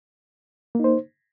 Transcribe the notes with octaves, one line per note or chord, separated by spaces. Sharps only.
A#3 D#4 C5